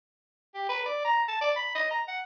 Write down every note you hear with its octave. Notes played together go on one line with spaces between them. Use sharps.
G4
B4
D5
A#5
A5
D5
B5
D#5
A#5
F#5